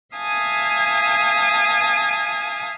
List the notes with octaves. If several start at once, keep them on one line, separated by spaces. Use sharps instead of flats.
E5 F5 G#5 A5 D#6